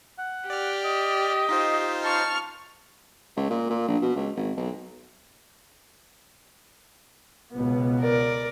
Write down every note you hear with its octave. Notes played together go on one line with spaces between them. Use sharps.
F#5
G4 D5 F6
D#5
D#4 F4 C5
A5 C#6 F6
C#2
A#2
A#2
A#1
B2
C#2
G#1
B1
C#2 B2 B3
A#4 D5